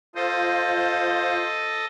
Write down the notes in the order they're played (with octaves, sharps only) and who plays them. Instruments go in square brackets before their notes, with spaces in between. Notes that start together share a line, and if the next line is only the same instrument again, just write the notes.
[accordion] F4 C5 [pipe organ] A4 D#5